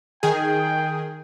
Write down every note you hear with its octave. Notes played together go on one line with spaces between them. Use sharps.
D#3 G#4 G5